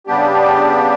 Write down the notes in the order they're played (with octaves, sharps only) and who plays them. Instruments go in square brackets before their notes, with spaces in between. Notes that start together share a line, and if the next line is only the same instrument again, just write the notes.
[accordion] C#3 G3 B3 D4 G4